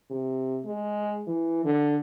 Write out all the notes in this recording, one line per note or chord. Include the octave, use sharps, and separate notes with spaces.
C3
G#3
E3
D3